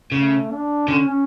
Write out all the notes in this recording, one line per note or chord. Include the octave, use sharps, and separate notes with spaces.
C#3 A3
D4
D3 C#4
C#4